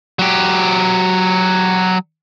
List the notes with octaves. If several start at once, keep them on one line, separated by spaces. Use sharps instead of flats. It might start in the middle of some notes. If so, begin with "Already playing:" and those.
F#3 G4